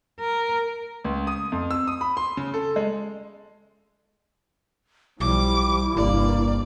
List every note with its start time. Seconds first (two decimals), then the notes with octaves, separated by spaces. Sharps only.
0.20 A#4
1.05 C#2
1.27 D#6
1.52 F2
1.71 E6
1.87 D#6
2.01 B5
2.17 C6
2.37 C#3
2.54 A4
2.76 G#3
5.20 B1 F3 G3 E4 D6
5.97 G1 C2 G2 A#3 D5